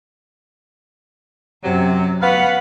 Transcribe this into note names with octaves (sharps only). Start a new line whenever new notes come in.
F#2 C3 F#3
B3 F#4 B4 F5 F#5